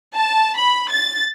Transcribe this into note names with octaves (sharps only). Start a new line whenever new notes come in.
A5
B5
A6